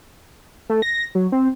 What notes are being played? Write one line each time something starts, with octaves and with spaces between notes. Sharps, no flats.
A3
A#6
F#3
C4